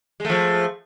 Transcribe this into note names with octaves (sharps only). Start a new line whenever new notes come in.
F3 G#3 A3